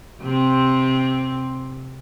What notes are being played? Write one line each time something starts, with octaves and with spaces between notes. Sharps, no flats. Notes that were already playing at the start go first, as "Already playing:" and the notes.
C3 C4